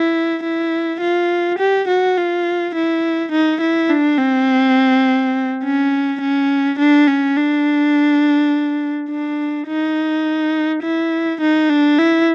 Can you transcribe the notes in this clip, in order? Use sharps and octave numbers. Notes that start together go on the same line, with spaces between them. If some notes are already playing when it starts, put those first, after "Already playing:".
Already playing: E4
E4
F4
G4
F#4
F4
E4
D#4
E4
D4
C4
C#4
C#4
D4
C#4
D4
D4
D#4
E4
D#4
D4
E4